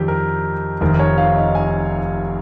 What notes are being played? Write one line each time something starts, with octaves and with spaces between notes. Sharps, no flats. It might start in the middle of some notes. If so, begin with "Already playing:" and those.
Already playing: F2 D#3 G3 G4
A#4
F1 F2 D#3 A#4
C#5
F5
D#5
G#5